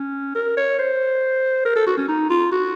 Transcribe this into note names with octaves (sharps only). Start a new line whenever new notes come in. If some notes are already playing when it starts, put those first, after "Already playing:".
Already playing: C#4
A#4
C#5
C5
A#4
A4
F#4
C#4
D#4
F4
F#4